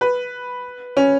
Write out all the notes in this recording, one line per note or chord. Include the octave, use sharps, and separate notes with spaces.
B4
C#4